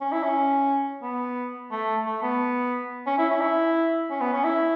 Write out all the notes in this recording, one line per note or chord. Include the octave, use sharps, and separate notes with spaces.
C#4
E4
C#4
B3
A3
A3
B3
C#4
E4
C#4
E4
C#4
B3
C#4
E4